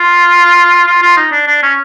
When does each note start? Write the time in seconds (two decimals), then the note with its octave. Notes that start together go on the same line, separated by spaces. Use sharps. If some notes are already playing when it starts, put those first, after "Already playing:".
Already playing: F4
0.87 F4
1.02 F4
1.17 D#4
1.32 D4
1.48 D4
1.63 C#4